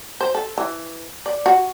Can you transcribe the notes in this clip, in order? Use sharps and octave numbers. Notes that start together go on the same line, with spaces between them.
C5
A4
E3
D5
F#4